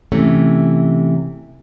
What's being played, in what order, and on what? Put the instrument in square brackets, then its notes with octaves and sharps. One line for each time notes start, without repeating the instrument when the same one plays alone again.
[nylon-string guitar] C3 E3 A3 C#4